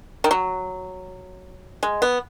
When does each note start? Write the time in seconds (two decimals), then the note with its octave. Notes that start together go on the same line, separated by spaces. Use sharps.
0.24 D#3
0.31 F#3
1.83 G#3
2.02 B3